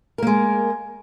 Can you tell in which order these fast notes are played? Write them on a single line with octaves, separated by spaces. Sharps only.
A#4 A#3 G#3